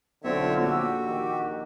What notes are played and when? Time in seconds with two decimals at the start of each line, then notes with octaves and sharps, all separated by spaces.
0.24 B1 D3 C4 F4 C5 C#5 E5
0.61 A#1 F#4 G4 E6
1.06 D#3 G4